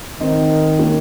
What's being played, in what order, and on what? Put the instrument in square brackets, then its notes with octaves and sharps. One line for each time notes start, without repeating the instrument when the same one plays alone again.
[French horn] D#3 [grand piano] C4 D#4
[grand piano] A#3 C#4